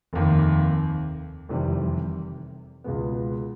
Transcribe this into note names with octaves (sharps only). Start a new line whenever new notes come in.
F1 D#2 D#3
F1 E2 C3 D#3 G3
C#2 B2 G#3 B3